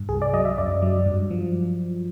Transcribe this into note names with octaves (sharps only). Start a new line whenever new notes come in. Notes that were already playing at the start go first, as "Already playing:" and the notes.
Already playing: G2
C2 G#4
D5
F#3 D#5
E5
F#2 D5
F#3
G2
F3